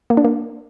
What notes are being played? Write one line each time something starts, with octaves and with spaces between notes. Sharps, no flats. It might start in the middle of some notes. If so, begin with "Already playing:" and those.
A#3
D4
A#3